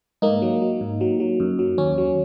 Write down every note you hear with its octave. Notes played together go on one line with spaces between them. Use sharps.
G#2 A#3 D#4
F#3
F#3
G#2
F#3
F#3
F#2
F#3
D#2 C#4
F#3